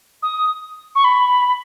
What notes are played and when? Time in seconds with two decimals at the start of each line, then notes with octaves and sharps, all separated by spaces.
0.22 D#6
0.95 C#6
1.04 B5